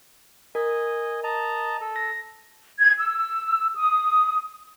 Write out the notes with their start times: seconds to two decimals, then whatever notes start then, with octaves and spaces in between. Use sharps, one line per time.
0.55 A#4 D#5 G#5
1.24 D#5 A5 A#5
1.81 A4
1.96 A#6
2.78 G#6
3.00 E6
3.75 D#6